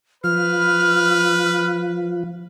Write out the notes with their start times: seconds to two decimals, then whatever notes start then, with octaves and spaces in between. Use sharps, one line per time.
0.24 F3 B4 F6